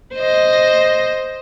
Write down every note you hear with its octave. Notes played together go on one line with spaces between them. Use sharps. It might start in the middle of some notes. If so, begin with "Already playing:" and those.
C5 D#5